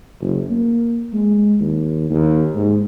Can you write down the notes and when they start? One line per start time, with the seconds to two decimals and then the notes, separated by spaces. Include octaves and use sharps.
0.21 F#1
0.51 A#3
1.13 G#3
1.60 D#2
2.10 D#2
2.54 G#2